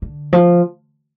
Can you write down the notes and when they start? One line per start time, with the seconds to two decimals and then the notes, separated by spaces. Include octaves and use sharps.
0.02 D3
0.33 F3